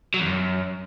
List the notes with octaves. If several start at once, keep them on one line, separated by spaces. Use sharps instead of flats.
F#3
E2
F#2